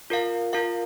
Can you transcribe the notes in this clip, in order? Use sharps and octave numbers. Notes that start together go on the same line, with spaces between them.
F4 A#4 F5
F4 A#4 F5